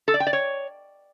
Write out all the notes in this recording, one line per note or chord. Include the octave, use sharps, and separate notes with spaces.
A4
D5
G5
D5
C#5